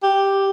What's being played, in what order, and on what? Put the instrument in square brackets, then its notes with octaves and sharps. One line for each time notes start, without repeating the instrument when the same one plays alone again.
[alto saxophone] G4